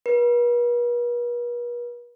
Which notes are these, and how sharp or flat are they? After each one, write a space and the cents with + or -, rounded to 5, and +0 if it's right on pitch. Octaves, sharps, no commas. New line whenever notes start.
B4 -45